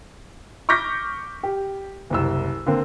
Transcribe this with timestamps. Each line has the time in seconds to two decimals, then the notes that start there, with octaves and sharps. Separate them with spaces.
0.69 C#6 D6 F6 G6 A#6 B6
1.43 G4
2.10 F#1 C2 E6
2.66 D3 A#3 C4